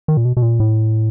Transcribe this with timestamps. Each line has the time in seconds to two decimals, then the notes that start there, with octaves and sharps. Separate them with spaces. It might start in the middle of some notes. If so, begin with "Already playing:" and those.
0.08 D#3
0.17 A#2
0.25 B2
0.37 B2
0.42 A#2
0.60 A2